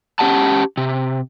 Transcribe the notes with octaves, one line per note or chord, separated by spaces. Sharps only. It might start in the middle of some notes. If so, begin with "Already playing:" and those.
C#4 G4 F#5 A5
C3